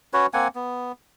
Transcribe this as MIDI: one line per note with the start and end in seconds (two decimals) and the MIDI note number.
0.13 0.26 61
0.13 0.26 66
0.13 0.26 71
0.13 0.26 73
0.34 0.48 58
0.34 0.48 60
0.34 0.48 78
0.34 0.48 80
0.55 0.92 59